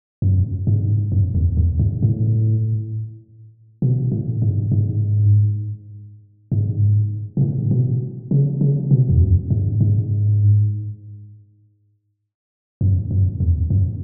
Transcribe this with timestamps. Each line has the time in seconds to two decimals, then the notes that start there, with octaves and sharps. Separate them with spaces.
0.22 F#2
0.67 G#2
1.12 F#2
1.35 E2
1.57 E2
1.79 G#2
2.02 A2
3.82 B2
4.12 A2
4.42 G#2
4.72 G#2
6.52 G#2
7.37 B2
7.41 A2
7.71 B2
8.31 C#3
8.61 C#3
8.91 B2
9.10 E2
9.21 F#2
9.50 G#2
9.81 G#2
12.81 F#2
13.11 F#2
13.40 E2
13.70 F#2